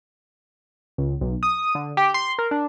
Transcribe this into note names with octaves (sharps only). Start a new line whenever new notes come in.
C#2
B1
D#6
D3
G4
C6
A#4
D4